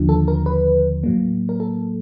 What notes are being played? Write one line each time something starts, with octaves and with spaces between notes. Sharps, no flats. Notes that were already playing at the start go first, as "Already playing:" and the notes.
Already playing: D#2 D3 F3
A4
A#4
B4
A2 F#3 A#3
A#4
A4